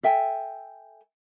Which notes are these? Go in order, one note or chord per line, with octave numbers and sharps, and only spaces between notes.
A4 E5 G5 G#5